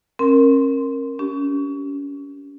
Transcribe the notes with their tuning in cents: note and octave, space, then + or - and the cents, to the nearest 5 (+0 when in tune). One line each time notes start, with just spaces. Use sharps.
C#4 -40 A#4 +0 C6 +0
C#4 +35 G4 -25